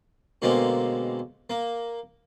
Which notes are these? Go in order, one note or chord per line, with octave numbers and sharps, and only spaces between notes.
B2 D3 G#3 A#3 C4
A#3